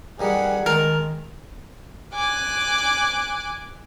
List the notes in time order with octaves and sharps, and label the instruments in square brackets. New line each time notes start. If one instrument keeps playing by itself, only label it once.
[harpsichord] G2 D#3 G3 [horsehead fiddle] G#4 F#5
[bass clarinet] D#3 [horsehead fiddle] G#3 [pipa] A#4 [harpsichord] A5
[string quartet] G#5 D6 F#6